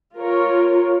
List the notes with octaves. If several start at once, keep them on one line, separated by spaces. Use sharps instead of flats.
F4 A#4 C#5